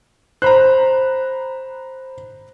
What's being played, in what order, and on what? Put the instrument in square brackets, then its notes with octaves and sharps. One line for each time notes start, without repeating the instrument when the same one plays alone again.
[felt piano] C5 [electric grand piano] A#5 B5 F#6